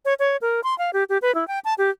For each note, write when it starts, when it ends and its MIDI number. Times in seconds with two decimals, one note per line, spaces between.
0.05 0.14 73
0.19 0.37 73
0.41 0.61 70
0.64 0.77 84
0.78 0.91 77
0.93 1.04 67
1.09 1.18 67
1.22 1.34 71
1.35 1.47 64
1.48 1.59 79
1.65 1.74 81
1.78 1.90 67